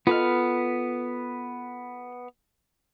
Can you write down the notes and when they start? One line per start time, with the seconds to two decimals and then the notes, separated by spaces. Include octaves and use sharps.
0.07 B3 F4 A4 B4 D#5 F6